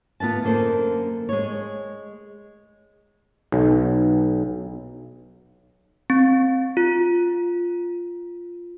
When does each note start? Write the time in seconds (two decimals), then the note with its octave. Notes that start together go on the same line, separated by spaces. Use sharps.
0.20 D2 B3 F4 B4 A5
0.43 F#2 D3 A#3 A4 C5
1.29 G#3 C#5
3.52 B1
6.10 C4
6.77 F4